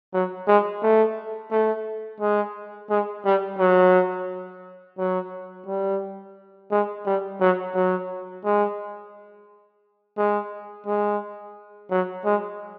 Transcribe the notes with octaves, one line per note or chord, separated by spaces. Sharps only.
F#3
G#3
A3
A3
G#3
G#3
G3
F#3
F#3
G3
G#3
G3
F#3
F#3
G#3
G#3
G#3
F#3
G#3